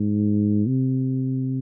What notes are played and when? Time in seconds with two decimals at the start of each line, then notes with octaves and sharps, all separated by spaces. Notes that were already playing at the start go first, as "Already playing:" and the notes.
Already playing: G#2
0.67 C3